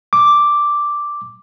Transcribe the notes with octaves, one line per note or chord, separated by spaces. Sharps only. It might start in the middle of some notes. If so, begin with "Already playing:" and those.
D6